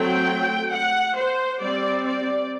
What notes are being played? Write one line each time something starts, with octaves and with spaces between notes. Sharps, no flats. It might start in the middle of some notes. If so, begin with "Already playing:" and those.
Already playing: F#3 A3 C4 G5
F#5
C5
G3 C4 D5
D5